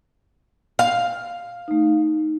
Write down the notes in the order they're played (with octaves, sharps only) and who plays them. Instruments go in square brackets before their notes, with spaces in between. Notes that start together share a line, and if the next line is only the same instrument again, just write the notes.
[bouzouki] F5
[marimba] A3 D#4